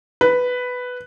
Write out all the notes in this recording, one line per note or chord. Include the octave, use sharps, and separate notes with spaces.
B4